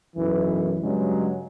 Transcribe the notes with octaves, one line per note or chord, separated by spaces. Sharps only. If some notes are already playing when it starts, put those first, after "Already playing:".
B1 F#2 E3
G2 C#3 F#3 G#3